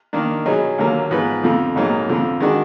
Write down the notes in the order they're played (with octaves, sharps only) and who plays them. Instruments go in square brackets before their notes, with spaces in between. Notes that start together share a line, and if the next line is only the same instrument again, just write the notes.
[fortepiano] D#3 A#3 D4
B2 F#3 B3 D#4 G#4
D#2 D3 F#3 A#3
G#2 F3 B3 F4 B4
F2 D3 F3
A#1 G#2 F#3 A#3 D#4
F2 D3 F3
D#3 G#3 D4 F#4